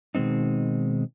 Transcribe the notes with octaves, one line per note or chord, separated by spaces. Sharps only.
B2 D#3 G#3 C4 D#4